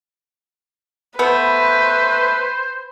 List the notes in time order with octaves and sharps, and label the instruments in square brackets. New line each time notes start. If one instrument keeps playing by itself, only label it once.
[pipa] A3 B3 [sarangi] B4 [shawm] C5